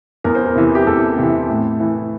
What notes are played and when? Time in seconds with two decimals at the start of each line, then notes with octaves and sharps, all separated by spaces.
0.24 E2 A#4
0.35 C5
0.46 A#4
0.55 C3 E3
0.75 G4
0.87 E2 A4
1.18 C3 E3
1.49 A2
1.80 E3